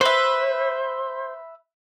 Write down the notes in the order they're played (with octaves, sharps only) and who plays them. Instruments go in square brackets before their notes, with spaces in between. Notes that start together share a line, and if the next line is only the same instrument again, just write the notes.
[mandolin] B4 E5 [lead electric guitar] C5